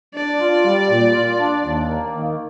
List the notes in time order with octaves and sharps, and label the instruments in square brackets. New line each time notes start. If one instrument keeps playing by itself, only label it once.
[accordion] D4 [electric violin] D5
[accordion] F4
G3
A#2
F4
D4
D#2
A#3
D#3